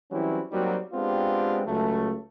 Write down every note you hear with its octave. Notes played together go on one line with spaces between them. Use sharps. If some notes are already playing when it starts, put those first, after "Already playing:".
E3 F#3 G3 C4 C#4 E4
F#3 G3 A#3 C4 D#4 F#4
G#3 B3 C4 D4 F4 G4
C#2 C#3 F#3 A3